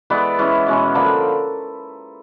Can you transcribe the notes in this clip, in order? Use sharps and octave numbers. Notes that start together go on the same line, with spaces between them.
E3 G#3 B3 D5 E5
E3 G#3 C#4 E4
B2 G#3 C#4
D3 F3 A#3 D4 A5 B5